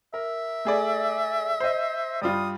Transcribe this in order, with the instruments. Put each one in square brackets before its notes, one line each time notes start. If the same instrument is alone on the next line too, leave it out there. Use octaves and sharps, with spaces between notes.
[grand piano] A#4 [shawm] E5
[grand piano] A3 G#4 D5
C5 D#5
[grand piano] G2 G3 F4 [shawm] D#6